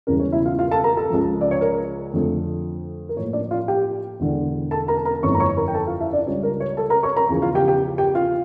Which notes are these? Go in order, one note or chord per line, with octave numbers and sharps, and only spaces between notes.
E1 E2 C#3 G3 C#4 A#4
C#5
E4 E5
F4 F5
F4 F5
A4 A5
A#4 A#5
A4 A5
C#2 C#3 F3
D5
C#5
A#4
F2 D3 F3 A3
A#4
A2 F3 A#3 C#5
D4 D5
F4 F5
G4 G5
E1 E2 D3
A4 A5
A#4 A#5
A#4 A#5
G1 F2 E3 A3 C#5 C#6
A#5
C#5 C#6
A#4 A#5
G5
A4 A5
F4 F5
E4 E5
D4 D5
C#2 C#3 G3 D4 F4 C#5
A#4
C#5
A4 A5
A#4 A#5
C#5 C#6
A#4 A#5
E2 C#3 F3
F4 F5
G4 G5
G4 G5
G4 G5
F4 F5